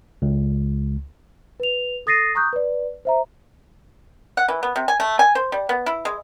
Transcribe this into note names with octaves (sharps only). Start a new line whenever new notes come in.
C#2
B4 F7
A4 D#6 A6 A#6 C7 D#7
A#5 C#6 D#6 F#6 G6
B4 D5
C5 E5 A#5
F#5
E3
B3
C3
G#5
A3
G#5
C5
G3
B3
E4
G#3